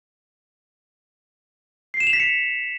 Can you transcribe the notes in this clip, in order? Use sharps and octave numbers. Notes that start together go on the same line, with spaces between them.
C7
E7
F7
B6
C#7